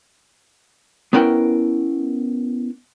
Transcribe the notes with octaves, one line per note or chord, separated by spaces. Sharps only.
B3 C#4 E4 A#4 F#5 G5